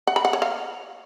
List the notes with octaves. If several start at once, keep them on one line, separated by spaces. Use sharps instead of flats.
F#5
B5
F#5
C#5
F5